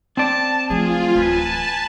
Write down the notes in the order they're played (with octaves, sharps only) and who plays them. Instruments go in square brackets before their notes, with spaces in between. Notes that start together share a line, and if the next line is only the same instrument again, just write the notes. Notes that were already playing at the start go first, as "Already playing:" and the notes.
[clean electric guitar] C4 D5 [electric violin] A5
[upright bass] F3 A3 [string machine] F4 [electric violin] G#4
[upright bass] D1 E3 [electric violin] B4 G#5 [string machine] A5